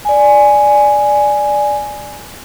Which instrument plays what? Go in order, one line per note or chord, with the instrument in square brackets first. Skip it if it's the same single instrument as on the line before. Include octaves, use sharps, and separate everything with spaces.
[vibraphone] D5 G#5